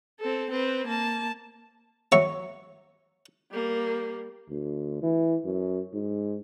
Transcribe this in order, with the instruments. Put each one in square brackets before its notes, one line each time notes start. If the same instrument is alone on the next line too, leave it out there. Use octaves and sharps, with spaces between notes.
[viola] C4 A4
C4 B4
A#3 A5
[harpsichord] F#3 C#5 E5 C#6
[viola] G3 A#3
[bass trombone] D2
E3
F#2
G#2